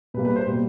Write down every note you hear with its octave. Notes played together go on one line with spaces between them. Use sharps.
B2 G3 A#3 B4
B4
C5
B2 G3 A#3